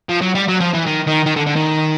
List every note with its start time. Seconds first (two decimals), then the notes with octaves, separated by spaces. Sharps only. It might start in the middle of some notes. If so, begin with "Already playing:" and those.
0.09 F3
0.22 F#3
0.35 G3
0.48 F#3
0.61 F3
0.74 E3
0.87 D#3
1.07 D#3
1.26 D#3
1.36 D3
1.47 D3
1.56 D#3